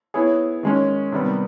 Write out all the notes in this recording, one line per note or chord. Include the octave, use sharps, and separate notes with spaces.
B3 E4 G#4 C#5
D#3 G#3 C#4
C3 D#3 G3 B3